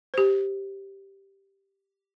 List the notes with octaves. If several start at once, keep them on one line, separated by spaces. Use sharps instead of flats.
G4 C5